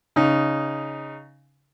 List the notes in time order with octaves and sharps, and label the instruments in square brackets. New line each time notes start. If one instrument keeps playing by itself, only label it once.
[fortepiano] C#3 D#4